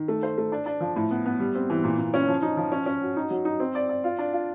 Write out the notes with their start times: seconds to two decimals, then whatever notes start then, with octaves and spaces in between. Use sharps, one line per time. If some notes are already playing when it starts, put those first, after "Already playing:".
Already playing: D#3
0.08 A3
0.23 C5
0.38 A3
0.52 D4
0.66 D4
0.81 F3
0.96 A2
1.11 B3
1.26 B3
1.40 G3
1.55 C4
1.70 E3
1.84 A#2
1.99 A#2
2.14 C#4
2.28 F3
2.42 D#4
2.57 F3
2.72 C#4
2.86 C#4
3.02 F#4
3.16 D#4
3.31 F#3
3.45 D#4
3.60 C4
3.75 D5
3.89 D5
4.04 F4
4.19 D4
4.33 F4